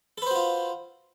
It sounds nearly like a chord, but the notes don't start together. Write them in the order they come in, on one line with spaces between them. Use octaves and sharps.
A4 B4 C5 F#4 F4